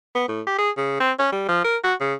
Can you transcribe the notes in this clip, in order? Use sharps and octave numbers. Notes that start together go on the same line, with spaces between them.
B3
A2
G4
G#4
C#3
C4
C#4
G3
F3
A#4
F#4
C#3